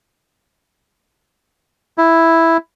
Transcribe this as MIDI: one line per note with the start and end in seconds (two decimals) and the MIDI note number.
1.98 2.57 64